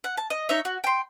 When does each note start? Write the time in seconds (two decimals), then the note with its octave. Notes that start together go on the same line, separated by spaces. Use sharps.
0.04 F#5
0.17 A5
0.30 D#5
0.49 D#4 C#5 E5
0.65 F#4
0.84 G5 C6